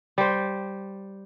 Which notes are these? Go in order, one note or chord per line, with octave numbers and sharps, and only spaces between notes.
G3 C5